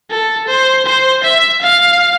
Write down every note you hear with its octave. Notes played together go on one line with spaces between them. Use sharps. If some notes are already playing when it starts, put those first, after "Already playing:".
A4
C5
C5
E5
F5